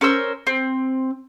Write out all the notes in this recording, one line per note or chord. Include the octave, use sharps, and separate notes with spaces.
C#4 A#4 C5 E6
C4